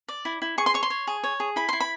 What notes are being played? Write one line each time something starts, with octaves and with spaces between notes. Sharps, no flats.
D5
E4
E4
G#4 C#6
C6
C#5 C#6
C6
C#5
G#4
C#5
G#4
E4 B5
E4 C6
B5